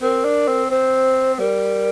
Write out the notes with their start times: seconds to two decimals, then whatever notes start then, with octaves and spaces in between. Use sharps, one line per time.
0.02 C4 A#4
0.25 D4
0.48 C4
0.70 C4 C5
1.39 G3 A#4